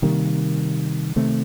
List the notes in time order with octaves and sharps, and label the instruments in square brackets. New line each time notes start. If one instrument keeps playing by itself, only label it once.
[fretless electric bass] C3 D#3 G3 A#3
C3 D#3 A3 C4